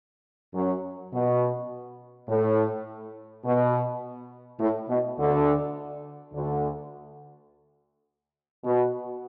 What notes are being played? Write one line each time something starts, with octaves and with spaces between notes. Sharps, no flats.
F#2 F#3
B2
A2
B2
A2
B2
D2 D3
D2 D3
B2